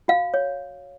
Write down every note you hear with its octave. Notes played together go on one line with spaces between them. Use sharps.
F#4 F5
C#5